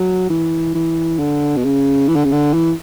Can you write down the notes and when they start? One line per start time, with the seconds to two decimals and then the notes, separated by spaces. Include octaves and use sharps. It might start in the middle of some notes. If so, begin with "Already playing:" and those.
Already playing: F#3
0.30 E3
0.75 E3
1.19 D3
1.57 B2
1.65 C#3
2.09 E3
2.16 D3
2.25 C#3
2.32 D3
2.54 E3